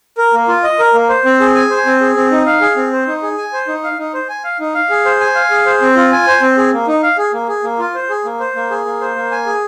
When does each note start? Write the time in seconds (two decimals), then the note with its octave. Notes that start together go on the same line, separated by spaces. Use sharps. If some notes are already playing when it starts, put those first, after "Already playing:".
0.18 A#4
0.33 A#3
0.48 F4
0.64 D#5
0.79 A#4
0.94 A#3
1.09 C5
1.25 C4
1.40 G#4
1.55 G#5
1.70 C5
1.86 C4
2.00 G#4
2.16 C4
2.31 D#4
2.46 F5
2.61 G#4
2.76 C4
2.92 C5
3.07 D#4
3.22 G#4
3.38 G#5
3.53 C5
3.68 D#4
3.84 F5
3.98 D#4
4.14 C5
4.29 G#5
4.44 F5
4.60 D#4
4.75 F5
4.90 G#4
5.05 C5
5.21 G#5
5.35 F5
5.51 G#4
5.66 C5
5.82 C4
5.96 F4
6.12 G#5
6.27 C5
6.41 C4
6.57 G#4
6.73 A#3
6.88 D#4
7.03 F5
7.18 G#4
7.33 A#3
7.48 G#4
7.64 A#3
7.79 F4
7.95 C5
8.09 G#4
8.25 A#3
8.40 C5
8.56 A#3
8.70 G#4
8.86 A#3
9.01 C5
9.16 A#3
9.31 G#5
9.46 G#4